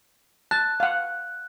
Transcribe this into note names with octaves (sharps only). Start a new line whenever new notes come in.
A5 F#6
F5 F#5